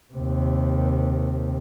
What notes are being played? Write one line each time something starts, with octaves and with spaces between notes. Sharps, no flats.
D#2 C3